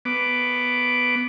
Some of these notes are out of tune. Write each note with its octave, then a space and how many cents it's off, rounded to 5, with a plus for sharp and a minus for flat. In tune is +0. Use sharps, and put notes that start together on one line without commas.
B3 +5 D6 +0